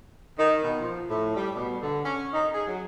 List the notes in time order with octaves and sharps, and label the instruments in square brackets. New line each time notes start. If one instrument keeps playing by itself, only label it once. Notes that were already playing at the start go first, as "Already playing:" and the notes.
[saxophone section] D#3
B2
F3
A2
G3
B2
D3
C#4
D#4
G#4
F#3